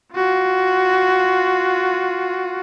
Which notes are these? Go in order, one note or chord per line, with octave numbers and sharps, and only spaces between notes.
F4 F#4